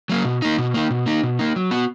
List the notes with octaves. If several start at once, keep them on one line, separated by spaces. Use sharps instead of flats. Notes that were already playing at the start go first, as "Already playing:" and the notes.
F#3 A#3
B2
A#3 D#4
B2
A#3 D#4
B2
A#3 D#4
B2
A#3 D#4
F#3
B3 F#4